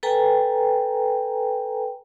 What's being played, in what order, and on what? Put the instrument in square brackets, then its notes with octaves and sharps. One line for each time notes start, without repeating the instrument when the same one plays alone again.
[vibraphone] A4 B4 G5 G#5 A#5